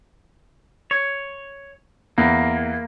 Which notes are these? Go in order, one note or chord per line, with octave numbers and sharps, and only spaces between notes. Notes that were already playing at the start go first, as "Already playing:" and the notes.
C#5
E2 A#3